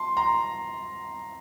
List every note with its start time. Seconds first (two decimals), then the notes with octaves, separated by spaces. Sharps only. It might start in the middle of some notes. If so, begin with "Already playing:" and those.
Already playing: A5 C6
0.17 A#5 C6